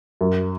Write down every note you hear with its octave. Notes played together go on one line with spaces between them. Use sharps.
F#2